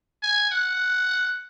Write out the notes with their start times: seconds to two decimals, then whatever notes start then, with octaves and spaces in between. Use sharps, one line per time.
0.23 G#5
0.51 F#5